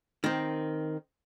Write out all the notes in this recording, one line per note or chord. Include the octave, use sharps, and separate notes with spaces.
D#3 C4